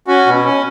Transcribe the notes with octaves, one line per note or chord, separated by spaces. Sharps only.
C#4 F#4
B2
C#4